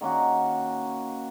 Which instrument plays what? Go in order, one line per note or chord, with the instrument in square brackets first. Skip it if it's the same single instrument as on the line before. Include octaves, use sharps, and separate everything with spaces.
[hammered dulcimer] D#3 A#3 C#4 F#4